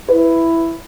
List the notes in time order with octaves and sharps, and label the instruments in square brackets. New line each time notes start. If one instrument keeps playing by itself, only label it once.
[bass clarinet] E4 [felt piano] B4